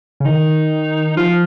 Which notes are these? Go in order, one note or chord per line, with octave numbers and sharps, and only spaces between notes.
C#3
D#3 D#4
F3 F4